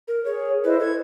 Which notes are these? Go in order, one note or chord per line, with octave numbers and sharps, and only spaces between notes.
A#4
G#4 C#5
E4 B4 C5 D#5
A4 G#6